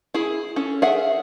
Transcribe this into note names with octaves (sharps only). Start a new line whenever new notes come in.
E4 G#4
C#4 A4
G#4 A#4 E5 F#5